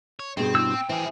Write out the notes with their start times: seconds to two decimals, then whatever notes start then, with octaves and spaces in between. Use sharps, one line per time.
0.20 C#5
0.37 G2 B2 C4 G#4
0.55 E4 E6
0.75 G5
0.89 E3 C4 G#4